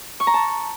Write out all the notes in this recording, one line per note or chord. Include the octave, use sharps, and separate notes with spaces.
C#6
A#5
A5